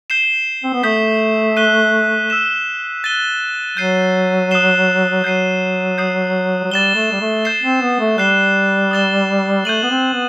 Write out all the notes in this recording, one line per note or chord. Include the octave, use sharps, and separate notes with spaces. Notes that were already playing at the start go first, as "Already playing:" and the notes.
G6 C7 E7 G7
C4
B3
A3 D#6 G6 B6
F#6 B6 D#7 G7
E6 B6 E7
F#6 A6 D#7 G7
F#3 G6 C7 D#7
D#6 F#6 C7 E7 G7
F#3 G6 C7 D#7
D#6 G6 C7
F#3
G3 A6 E7 G7
A3
G3
A3
G6 C7 E7 G7
C4
B3
A3
G3 F#6 C7 E7 G7
D#6 A6 E7 G7
A3 G6 D#7 F#7
B3
C4
B3